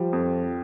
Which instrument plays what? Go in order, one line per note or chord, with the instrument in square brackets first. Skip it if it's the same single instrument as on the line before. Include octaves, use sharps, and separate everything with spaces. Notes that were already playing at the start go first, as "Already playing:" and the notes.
Already playing: [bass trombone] F3 [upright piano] G3
[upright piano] F2